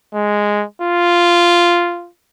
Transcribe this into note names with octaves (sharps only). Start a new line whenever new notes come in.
G#3
F4